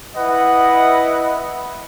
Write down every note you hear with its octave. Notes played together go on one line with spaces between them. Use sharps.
E4 B4 D#5 F#5